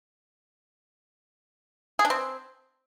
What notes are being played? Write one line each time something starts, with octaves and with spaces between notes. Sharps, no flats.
G#4
D4
C4